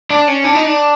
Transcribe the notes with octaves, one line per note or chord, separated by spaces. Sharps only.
D4
C#4
D4
D#4
D4